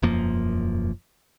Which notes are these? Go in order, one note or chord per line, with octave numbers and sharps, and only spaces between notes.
E1 F#2 F3 A#3